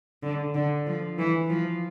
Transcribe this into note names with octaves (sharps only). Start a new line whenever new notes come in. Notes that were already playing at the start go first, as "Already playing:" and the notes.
D3
D3
F3
E3
F3